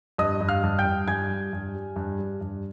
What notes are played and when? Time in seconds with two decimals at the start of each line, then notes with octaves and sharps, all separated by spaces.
0.18 G2 D#5 D#6
0.41 G2
0.48 F5 F6
0.63 G2
0.79 G5 G6
0.85 G2
1.08 G2 G#5 G#6
1.29 G3
1.53 G2
1.75 G3
1.96 G2
2.19 G3
2.41 G2